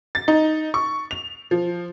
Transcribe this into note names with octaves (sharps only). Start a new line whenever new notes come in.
A6
D#4
C#6
F7
F3